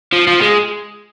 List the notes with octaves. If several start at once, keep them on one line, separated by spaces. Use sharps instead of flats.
F3
F3
G#3